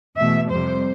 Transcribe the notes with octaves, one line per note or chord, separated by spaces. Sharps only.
E2 B2 A3 E5
F2 C3 G3 C5